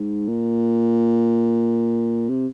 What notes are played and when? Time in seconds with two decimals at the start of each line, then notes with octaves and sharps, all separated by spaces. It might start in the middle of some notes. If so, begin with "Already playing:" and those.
Already playing: G#2
0.28 A#2
2.29 C3